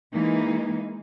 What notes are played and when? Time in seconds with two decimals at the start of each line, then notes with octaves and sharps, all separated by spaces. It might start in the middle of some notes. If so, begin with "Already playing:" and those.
0.14 E3 G#3 A#3 D#4